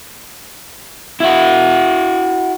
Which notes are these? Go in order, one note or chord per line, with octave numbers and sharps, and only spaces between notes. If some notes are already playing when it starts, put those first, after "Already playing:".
E4 F#4